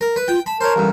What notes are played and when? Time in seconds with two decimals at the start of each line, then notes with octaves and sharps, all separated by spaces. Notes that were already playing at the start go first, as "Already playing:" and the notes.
0.01 A#4
0.16 B4
0.28 F4 G5
0.46 A5 B5
0.61 A#4 C5 C#5
0.76 A1 G2